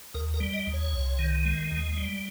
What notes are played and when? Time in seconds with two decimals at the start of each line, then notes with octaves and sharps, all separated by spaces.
0.14 D#2 A#4
0.34 A#4
0.40 G3
0.53 D#5
0.67 D#2
0.74 C#5
0.93 C2
1.19 D#3
1.45 G#3
1.71 D#2
1.97 G3